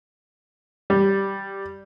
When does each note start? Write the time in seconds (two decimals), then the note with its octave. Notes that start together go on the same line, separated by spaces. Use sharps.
0.90 G3